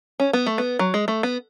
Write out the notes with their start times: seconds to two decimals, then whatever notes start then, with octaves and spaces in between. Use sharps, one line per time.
0.20 C#4
0.33 B3
0.46 A3
0.58 B3
0.79 F#3
0.94 G#3
1.08 A3
1.23 B3